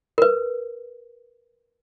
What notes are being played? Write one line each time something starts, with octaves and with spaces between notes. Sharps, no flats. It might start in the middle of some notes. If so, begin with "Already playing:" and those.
A#4 B4